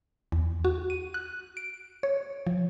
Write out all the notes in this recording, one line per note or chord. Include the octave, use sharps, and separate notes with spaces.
E2
F#4
D#7
F#6
D7
C#5
F3